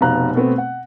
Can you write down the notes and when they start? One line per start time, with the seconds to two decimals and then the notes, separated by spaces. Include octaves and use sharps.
0.01 F1 B2 F5 A#5 F#6
0.34 B2 A3 B3 C4
0.58 F#5